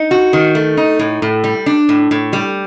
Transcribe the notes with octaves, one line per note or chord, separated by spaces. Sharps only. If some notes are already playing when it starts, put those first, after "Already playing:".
Already playing: D#4
F#4
D#3
A3
D#4
A2
A2
G3
D4
A2
A2
G3